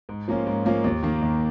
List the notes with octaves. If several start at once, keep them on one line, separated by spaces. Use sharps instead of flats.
G#2
F3 A#3 C#4 F4
G#2
F3 A#3 C#4 F4
D#2
D#3 A#3
D#2